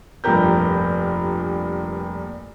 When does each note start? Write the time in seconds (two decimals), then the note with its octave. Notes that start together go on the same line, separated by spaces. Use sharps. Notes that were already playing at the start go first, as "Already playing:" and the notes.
0.24 F1 G2 A#2 G4 A#4 G6